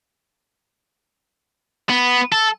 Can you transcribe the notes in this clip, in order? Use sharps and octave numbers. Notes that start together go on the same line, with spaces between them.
B3
A4